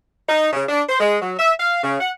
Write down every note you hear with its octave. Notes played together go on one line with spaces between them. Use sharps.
D#4
C#3
D4
C5
G#3
F#3
E5
F5
C#3
F#5